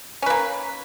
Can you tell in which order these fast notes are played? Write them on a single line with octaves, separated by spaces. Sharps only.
C#4 B4 A#3